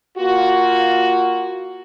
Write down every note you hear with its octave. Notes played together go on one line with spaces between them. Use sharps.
A#3 F4 F#4